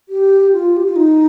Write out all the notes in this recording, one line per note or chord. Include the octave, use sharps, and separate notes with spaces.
G4
F4
G4
F4
D#4